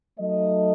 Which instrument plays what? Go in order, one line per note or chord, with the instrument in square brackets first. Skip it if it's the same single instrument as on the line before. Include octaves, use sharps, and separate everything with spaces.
[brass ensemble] F#3 A3 D#4 A4 D#5